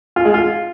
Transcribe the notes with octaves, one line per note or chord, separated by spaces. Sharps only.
F4
G#3
F4